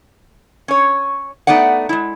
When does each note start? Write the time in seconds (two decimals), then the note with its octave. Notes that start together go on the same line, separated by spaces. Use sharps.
0.68 C#4 C#5
1.47 A3 B3 D#4 D5 F#5
1.89 G#3 E4